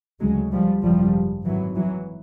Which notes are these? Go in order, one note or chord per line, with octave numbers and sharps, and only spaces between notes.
D2 C#3 F#3 G#3
F3 G3
G#1 F#2 C#3 F3 G3
G#1 G#2 E3 F#3
E3 F#3